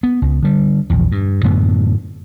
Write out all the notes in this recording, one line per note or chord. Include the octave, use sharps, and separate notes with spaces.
B3
C#2
D3 G3
A#1 E2
G2
F#2 A2 D3 B3